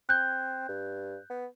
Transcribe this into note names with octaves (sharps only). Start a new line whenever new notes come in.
C4 F#6 G6
G2
B3